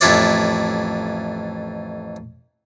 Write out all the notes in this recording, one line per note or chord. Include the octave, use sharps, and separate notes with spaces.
A1 F2 E4 F4 C#5 D5